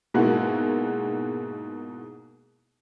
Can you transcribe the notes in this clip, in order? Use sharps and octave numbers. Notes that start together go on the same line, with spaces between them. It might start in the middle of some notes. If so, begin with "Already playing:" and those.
G#2 B2 G#3 A#3 E4 F#4